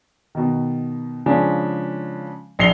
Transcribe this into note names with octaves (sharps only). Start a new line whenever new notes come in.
B2 D#3
C#3 F3 G#3 C#4 D4
A#1 D#5 C7 F7 G7